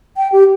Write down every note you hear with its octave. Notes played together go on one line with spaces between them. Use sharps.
G5
G4